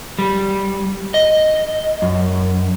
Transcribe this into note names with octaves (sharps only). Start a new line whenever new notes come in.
G3
D#5
F#2